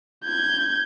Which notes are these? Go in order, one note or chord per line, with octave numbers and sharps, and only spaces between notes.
G6 G#6